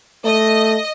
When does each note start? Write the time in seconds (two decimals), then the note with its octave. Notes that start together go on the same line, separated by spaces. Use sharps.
0.25 A3 D#5